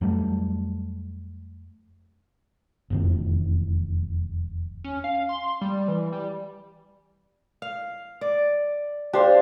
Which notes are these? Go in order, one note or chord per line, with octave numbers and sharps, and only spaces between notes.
F2 F#3 G3 A3
E1 F2 D#3
C#4
F5
C6
G3
E3
G3
F5
D5
D4 G4 C5 F5